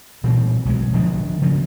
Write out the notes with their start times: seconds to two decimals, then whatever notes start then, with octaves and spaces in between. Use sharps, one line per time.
0.24 A#2 E3 G3 C4
0.65 B1 F#3 G#3
0.93 D1 D2 F3 D4
1.42 C#3 F3 F#3 A#3